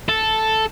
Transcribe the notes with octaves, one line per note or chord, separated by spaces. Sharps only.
A4